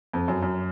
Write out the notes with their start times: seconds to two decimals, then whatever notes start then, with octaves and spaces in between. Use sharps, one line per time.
0.13 F2
0.28 F#2
0.43 F#2